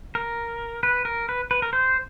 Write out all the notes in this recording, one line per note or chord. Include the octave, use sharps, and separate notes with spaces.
A#4
B4
A#4
B4
B4
A#4
C5